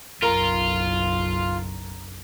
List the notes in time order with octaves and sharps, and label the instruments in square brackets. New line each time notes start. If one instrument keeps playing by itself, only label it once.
[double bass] F#1 B1 [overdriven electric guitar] F4 [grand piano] A#4